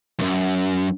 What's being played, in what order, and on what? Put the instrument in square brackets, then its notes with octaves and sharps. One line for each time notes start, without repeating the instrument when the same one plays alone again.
[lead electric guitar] B1 F#2